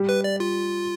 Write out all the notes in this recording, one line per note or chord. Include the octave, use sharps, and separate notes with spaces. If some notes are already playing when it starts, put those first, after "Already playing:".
Already playing: G3 G4
B4
D5
F4